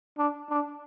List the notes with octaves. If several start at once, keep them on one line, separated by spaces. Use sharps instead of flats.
D4
D4